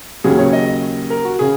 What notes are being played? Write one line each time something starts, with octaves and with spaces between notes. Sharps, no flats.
D#2 C#3 F#3 G#4
C#5
D#5
A#4
F#4
C#3 G#4